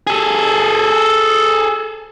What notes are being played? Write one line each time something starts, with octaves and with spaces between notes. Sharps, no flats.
G#4 A4